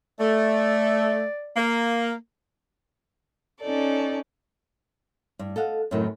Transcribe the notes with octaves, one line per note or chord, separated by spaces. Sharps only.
A3 D5
A#3
C#4 D#4 A4 D5
G2
A4 D#5 F5 F#5
F#2 A2 C3 D#3 F#3